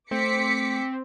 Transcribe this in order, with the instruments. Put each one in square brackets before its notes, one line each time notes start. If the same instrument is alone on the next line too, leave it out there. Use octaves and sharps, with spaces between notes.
[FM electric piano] A3 [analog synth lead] C4 [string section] D6 B6 C#7